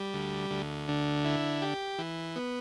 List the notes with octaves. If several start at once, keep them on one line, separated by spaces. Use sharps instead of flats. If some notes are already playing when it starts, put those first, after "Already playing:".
Already playing: G3
D2
D2
D3
E4
G4
E3
B3